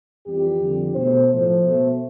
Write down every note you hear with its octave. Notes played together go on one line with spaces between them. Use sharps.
F2 E3 G3 G4
F2 D3 G3
B2 A3 C5
A2 F3 A3 C5
B2 A3